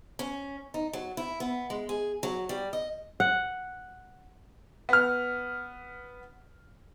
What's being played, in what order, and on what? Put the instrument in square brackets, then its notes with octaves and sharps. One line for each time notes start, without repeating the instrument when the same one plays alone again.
[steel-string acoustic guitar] C#4
D#4
F#3
E4
B3
G#3
G#4
F#3
G3
D#5
[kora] F#5
[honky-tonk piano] B3 F6